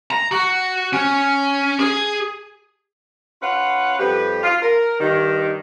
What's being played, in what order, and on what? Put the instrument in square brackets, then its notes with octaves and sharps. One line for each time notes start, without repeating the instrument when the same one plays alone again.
[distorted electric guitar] A#5
F#4
C#4
G#4
[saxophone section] C#4 F4 B4 F5 F#5
F2 G3 G4 B4
F4
A#4
G2 D#3